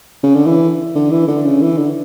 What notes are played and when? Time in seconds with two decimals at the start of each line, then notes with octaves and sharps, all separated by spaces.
0.24 C#3
0.35 D3
0.46 E3
0.95 D3
1.11 E3
1.28 D3
1.45 C#3
1.61 E3
1.78 D3